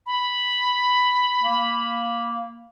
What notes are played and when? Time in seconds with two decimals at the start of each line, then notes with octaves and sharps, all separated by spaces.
0.06 B5
1.43 A#3